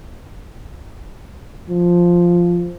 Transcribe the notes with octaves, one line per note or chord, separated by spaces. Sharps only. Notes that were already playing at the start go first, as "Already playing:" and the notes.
F3